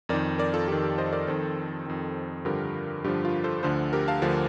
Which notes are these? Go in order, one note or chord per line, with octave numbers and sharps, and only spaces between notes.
F2 D#3 A#4 D5
A#4 D5
F4 A4
F2 D#3 G4
G4
C5 D#5
A#4 D5
F2 D#3 A4 C5
F2 D#3
G2 D3 F3 G4 A#4
G2 D3 F3 G4
F4
A4 C5
D2 D3 F3 A4 C5
G4 A#4
F5 A5
D2 D3 F3